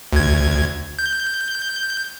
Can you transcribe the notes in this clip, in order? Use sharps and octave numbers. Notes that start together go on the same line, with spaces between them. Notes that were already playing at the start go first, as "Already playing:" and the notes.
D2 G#6
G6